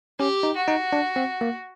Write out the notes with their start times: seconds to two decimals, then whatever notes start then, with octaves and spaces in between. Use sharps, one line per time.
0.19 C#4 G4
0.43 D#4
0.56 F#4
0.68 D#4
0.93 D4
1.16 C4
1.41 A#3